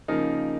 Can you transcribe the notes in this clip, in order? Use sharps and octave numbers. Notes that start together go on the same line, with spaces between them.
C#3 F3 A#3 D#4 A#4